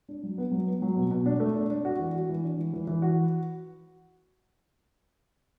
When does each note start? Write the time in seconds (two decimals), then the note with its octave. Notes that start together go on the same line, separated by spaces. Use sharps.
0.09 D4
0.23 F#3
0.38 B3
0.52 F#3
0.67 B3
0.82 F#3
0.97 B2
1.11 B2
1.26 D4
1.40 A3
1.55 D4
1.70 D4
1.85 F#4
1.99 E3
2.15 F#4
2.29 E3
2.43 D4
2.59 E3
2.73 E3
2.87 E3
3.02 F#4